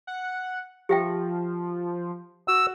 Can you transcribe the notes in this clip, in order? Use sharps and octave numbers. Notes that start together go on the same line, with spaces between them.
F#5
F3 G4 E5 G5
F#4 E6